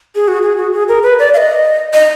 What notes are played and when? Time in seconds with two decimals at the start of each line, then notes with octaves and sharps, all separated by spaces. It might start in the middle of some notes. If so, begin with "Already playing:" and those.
0.15 G#4
0.28 F#4
0.43 G#4
0.57 F#4
0.73 G#4
0.88 A#4
1.03 B4
1.19 D5
1.34 F5
1.37 D#5
1.94 D#5